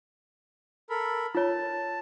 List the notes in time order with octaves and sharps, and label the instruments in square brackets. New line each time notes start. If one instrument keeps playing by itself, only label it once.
[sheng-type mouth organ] A4 A#4 B5
[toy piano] F4 C#5 [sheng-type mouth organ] A5